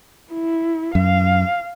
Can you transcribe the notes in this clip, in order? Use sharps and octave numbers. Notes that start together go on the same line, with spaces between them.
E4
F#2 F5